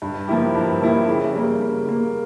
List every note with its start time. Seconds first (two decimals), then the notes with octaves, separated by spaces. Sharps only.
0.02 G2
0.28 F3 A#3 E4 G4
0.55 G2
0.81 F3 A#3 E4 G4
1.06 C#3
1.33 G3 A#3
1.60 C#3
1.87 G3 A#3